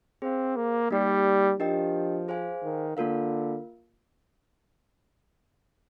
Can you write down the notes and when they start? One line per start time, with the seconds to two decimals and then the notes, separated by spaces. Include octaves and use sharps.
0.22 C4 G#4 C5 F5
0.56 A#3
0.91 G3 A#3 D#4 G4 D5
1.60 F3 D4 G4 A#4 D#5 G5
2.28 G#4 C5 F5 G#5
2.63 D#3
2.96 D3 A#3 F4 A#4 F5